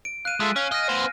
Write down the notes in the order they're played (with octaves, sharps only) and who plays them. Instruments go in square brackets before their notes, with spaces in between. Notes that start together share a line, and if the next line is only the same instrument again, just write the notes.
[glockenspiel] D7
[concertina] F5 [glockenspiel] F#6 D#7
[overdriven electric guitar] G#3 [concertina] F4 A4 E5
[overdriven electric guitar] C#4 [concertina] F5 G#5
[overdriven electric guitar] D#5 [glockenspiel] F6 A#6
[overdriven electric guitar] B3 C5